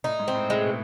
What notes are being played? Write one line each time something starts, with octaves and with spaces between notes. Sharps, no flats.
A2 D#4
G#2
C4
A2
A2 G#3
B2